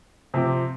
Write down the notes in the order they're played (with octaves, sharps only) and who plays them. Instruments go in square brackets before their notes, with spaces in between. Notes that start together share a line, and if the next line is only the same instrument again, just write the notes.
[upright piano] C3 F3 C4 G4